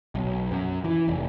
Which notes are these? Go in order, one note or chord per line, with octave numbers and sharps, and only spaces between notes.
B1
F#2
E3
F1